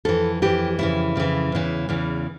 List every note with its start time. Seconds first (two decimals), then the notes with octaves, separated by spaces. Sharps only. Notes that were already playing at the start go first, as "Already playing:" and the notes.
0.05 F2 E3 A4
0.42 F2 E3 G4
0.79 F2 C#3 E3 E4
1.15 F2 C#3 E3
1.52 E2 C#3 E3
1.89 E2 C#3 E3